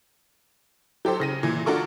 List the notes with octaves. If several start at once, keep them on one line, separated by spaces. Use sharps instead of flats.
F#3 G4 A4 C5
C#3 A#6 D#7
A#2 E3
D4 F4 F#4 A4 A#4 C#6